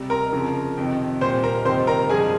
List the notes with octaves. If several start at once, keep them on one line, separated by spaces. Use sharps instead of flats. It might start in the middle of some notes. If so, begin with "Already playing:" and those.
Already playing: C3 G3
A#4 A#5
F2 C#3 F3
F2 C3 D#3
A#2 G3 C5 C6
A#4 A#5
F2 C3 D#3 G3 C5 C6
A#4 A#5
G2 F3 G#3 G#4 G#5